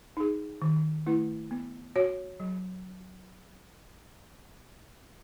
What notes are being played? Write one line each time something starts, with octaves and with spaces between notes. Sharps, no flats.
D#4 G#4
D#3
A3 E4 B4
B3
F#4 C#5
F#3